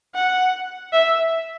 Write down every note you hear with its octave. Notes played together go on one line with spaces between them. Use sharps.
F#5
E5